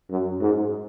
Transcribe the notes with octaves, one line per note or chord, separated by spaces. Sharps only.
F#2
G#2